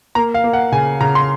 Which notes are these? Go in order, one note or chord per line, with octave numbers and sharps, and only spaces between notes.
A#3 A#5
F5
A#3
F#5
C#3 G#5
C#3 A#5
C6